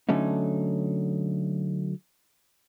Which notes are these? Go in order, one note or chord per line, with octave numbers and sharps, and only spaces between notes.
D3 F#3 A3 C#4 D#4